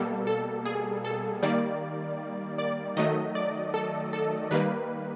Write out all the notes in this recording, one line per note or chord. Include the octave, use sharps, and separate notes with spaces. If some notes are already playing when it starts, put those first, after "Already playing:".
Already playing: B2 G3 A#3 A4
A4
G#4
A4
D#3 G3 A#3 D5
D5
D#3 F#3 A3 D#5
D5
A4
A4
D#3 G3 A#3 B4